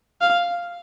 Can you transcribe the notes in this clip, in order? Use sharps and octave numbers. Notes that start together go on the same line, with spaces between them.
F5